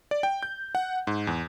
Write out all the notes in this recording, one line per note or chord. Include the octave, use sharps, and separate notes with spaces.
D5
G5
G6
F#5
G#2
E2